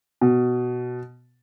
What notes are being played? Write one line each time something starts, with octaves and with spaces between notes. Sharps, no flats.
B2